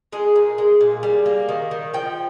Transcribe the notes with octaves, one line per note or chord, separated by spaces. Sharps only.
G#3 G#4
A#2
G#3
A#2
G3
A#3
D#3
D#3
F3 G5